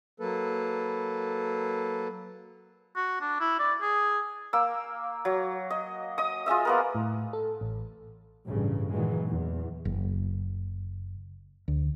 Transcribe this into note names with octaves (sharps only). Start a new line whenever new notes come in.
F#3 A#3 A4 B4
F#4
D4
E4
D5
G#4
A#3 E6
F#3
D#5
D#5 D#6
F4 G#4 D#5 E5
A#3 B3 A#4
A2
A4
A1
A1 G2 C#3
A#2 D#3 E3 F#3 G#3
E2
F#1
D2